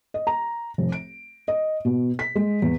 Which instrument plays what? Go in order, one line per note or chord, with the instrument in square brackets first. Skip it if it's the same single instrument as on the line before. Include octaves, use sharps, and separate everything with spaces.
[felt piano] D#5
A#5
F1
D7
D#5
B2
B6
G#3
E2